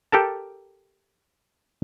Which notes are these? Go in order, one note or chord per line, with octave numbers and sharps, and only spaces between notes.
G4 A4 A#4 A5